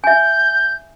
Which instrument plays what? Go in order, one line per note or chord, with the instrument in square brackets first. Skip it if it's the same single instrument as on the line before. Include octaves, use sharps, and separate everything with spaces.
[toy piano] E5 G#5 [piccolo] G6